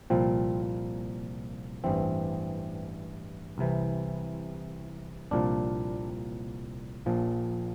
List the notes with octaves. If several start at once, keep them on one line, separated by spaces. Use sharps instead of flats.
C2 A#2 F3 C4
A1 G2 E3 C4
C2 C3 E3
C2 A#2 F3 D4
A#1 A#2 F3